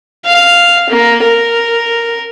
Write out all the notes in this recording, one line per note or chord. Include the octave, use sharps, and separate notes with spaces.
F5
A#3
A#4